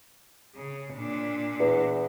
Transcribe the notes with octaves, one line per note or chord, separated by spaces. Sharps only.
C#3
A#2 D4
E2